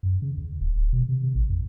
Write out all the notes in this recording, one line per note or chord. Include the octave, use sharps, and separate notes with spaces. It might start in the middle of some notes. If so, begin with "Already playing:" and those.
F#2
C#3
D#2
D1
D1
B2
C3
C3
A1
F2